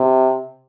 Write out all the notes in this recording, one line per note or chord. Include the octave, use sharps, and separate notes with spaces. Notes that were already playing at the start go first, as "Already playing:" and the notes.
Already playing: C3